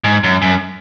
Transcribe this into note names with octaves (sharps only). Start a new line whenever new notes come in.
G#2
F#2
F#2